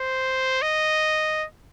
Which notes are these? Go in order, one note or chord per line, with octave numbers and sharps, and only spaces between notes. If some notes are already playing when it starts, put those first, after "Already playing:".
Already playing: C5
D#5